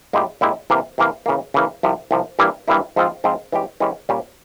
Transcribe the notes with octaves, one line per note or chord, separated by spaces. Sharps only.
A#2 G#3 E4 G4
A#2 G#3 E4 G4
C3 E3 A#3
C3 E3 A#3
C#3 E3 A#3
C#3 E3 A#3
C2 C3 F3
C2 C3 F3
G2 E3 G3 A#3 E4
G2 E3 G3 A#3 E4
G#2 F3 C4 F4
G#2 F3 C4 F4
E3 G#3 C#4 G4
E3 G#3 C#4 G4
A#2 G3 C#4 G4